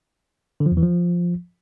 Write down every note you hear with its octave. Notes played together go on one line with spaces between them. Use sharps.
D3
F3
E2
E3
F3